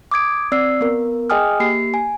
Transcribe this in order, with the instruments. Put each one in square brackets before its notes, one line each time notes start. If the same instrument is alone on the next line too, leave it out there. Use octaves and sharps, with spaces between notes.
[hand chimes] D6 D#6 G#6 D7
C4 D5 E6 C7
B3 A#4
G#4 D#5 G5 G#5 D#6 F6
A#3 G4 C7
G#5